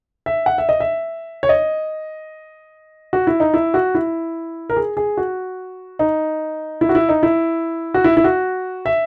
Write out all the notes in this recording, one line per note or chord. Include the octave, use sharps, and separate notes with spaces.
E5
F#5
E5
D#5
E5
C#5
D#5
F#4
E4
D#4
E4
F#4
E4
A#4
G#4
G#4
F#4
D#4
E4
F#4
E4
D#4
E4
F#4
E4
E4
F#4
E5